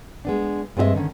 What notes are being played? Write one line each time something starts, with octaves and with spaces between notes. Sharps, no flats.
G#3 B3 D4
G2 G#3 C4 G4 D#5 E5
D3 D#3 C#4